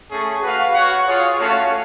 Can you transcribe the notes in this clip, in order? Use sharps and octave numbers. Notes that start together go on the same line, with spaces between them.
A3 C#4 G#4
F#4 B4 F5
F#4 C#5 F#5
F4 G#4 C#5
A3 C#4 F#4 C#5 F5